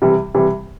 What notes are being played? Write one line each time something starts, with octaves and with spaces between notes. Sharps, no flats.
C3 E3 G3
C3 E3 G3